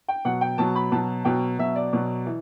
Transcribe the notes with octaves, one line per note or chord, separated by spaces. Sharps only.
G5
B2 F#3 F#5
G5
B2 F#3 A5
B5
B2 F#3 A5
B2 F#3 G5
B2 F#3 E5
D5
B2 F#3
E3